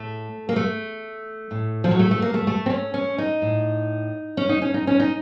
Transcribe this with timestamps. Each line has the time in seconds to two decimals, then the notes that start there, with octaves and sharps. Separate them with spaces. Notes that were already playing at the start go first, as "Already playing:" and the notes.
Already playing: A2 A3
0.49 A#3
0.56 A3
1.51 A2
1.84 F3
1.91 F#3
1.99 A3
2.11 A3
2.22 A#3
2.34 A3
2.47 A3
2.66 C4
2.70 C#4
2.94 C#4
3.18 D#4
3.42 A2
4.37 C#4
4.49 D#4
4.62 C#4
4.74 D#4
4.87 C#4
5.00 D#4